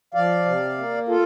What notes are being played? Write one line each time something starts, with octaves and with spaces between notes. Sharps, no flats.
F3 D5 F5
C3
A#3
F4 A4